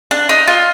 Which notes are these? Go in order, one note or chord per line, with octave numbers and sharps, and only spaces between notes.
D4
D#4
F4